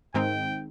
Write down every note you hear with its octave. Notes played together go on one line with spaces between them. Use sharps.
G#2 D#3 G#3 C4 D#4 G5